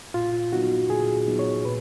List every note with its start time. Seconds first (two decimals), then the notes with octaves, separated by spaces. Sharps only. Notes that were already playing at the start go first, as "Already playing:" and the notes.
0.14 A#2 F4
0.52 F#3 B3 D#4 F#4
0.90 A#2 G#4
1.27 F#3 B3 D#4
1.39 C#5
1.65 A#2 B4